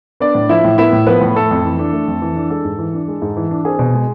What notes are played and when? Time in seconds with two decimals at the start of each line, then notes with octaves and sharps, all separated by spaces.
0.20 B3 D4 D5
0.35 A2
0.49 F3 E4 E5
0.65 A2
0.78 B3 E4 E5
0.93 A2
1.07 F3 B3 B4
1.21 A2
1.36 A3 A4
1.51 F2
1.64 E3
1.79 D4
1.93 A3
2.08 F2
2.22 E3
2.36 D4
2.50 G#3 A4
2.65 G#2
2.79 E3
2.94 D4
3.08 G#3
3.22 G#2
3.37 E3
3.51 D4
3.65 C4 G#4
3.79 B2
3.94 G#3